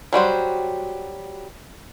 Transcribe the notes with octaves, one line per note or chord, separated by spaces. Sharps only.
F#3 G3 F#4 C5